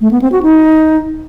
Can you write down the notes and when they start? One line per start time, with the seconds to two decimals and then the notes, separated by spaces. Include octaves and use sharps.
0.01 A3
0.11 B3
0.22 C4
0.32 F#4
0.43 D#4